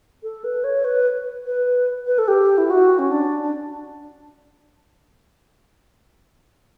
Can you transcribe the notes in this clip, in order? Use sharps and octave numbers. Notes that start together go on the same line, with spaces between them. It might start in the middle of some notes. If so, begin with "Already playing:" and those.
A4
B4
C#5
B4
B4
B4
A4
G4
E4
F#4
C#4
D4
D4